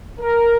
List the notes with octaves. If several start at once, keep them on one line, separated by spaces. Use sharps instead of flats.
A#4